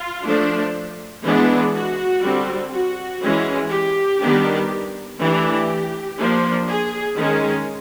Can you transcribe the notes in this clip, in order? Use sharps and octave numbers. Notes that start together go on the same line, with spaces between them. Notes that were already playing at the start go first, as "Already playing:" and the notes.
Already playing: F4
F3 A3 D4
E3 G#3 B3 D4
F#4
D3 G3 C4
F#4
E3 G#3 C#4
G4
D#3 G3 B3 D4
E3 A3 D4 G4
F3 A#3 D4
G#4
D#3 G#3 C#4